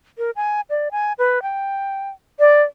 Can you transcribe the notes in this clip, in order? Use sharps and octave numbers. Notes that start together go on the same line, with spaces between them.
A#4
G#5
D5
G#5
B4
G5
D5